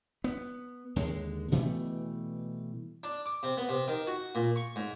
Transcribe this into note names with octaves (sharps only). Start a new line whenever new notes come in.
B3
D#2 D3 G#3
B2 E3 G3 A3
D4
D6
C3
B3
C3
D#3
F#4
A#2
C#6
G#2